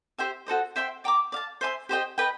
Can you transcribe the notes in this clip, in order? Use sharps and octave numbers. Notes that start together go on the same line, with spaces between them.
G4 C5 E5 G5
F#4 A4 C5 D#5
C5 E5 G5 C6
D5 G5 A#5 D6
D5 F5 A5
C5 E5 G#5 C6
G4 C5 D#5 G5
B4 D#5 G5